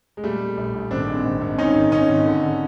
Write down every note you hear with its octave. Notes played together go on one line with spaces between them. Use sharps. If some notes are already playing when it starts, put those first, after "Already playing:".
G#3
A#2 G3 A3
A#2
A#1
A#1
G#1 C4 D4
G#2
G#1
G#1
D#3 C#4 D#4
G#1
G#1 C#4 D#4
G#1
D3
D3